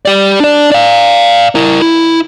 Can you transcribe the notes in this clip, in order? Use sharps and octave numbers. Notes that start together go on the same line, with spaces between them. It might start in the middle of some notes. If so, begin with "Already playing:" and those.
G4 D5
D4 D5
D5 F5
E4 A#4
E4